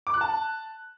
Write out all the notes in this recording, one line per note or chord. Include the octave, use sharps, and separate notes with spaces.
D6
F#6
A5